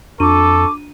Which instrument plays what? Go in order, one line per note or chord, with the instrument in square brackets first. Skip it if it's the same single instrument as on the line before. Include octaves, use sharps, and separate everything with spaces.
[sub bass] F2 [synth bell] D4 D#7 [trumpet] A4 [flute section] C#6 D6